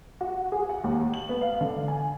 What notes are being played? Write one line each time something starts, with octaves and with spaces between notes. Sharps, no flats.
F#4
G#4
F#5
D#2
F#7
B3
F5
D3
G#5